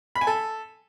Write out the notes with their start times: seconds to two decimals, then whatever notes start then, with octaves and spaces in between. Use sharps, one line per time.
0.15 B5
0.21 G#5
0.27 A4